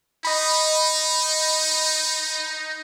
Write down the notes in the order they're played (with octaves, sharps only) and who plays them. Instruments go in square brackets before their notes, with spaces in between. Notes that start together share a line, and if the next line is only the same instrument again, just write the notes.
[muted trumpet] D#4 [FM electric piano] D#5 B5